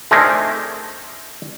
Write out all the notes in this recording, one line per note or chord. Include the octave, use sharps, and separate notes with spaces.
A3 C4 D4 D#4 G#4 A#4